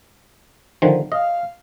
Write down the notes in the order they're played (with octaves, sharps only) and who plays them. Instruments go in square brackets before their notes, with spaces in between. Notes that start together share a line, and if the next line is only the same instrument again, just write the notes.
[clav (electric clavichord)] D3 D#3 F3
[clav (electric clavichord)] D#5 [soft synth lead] F5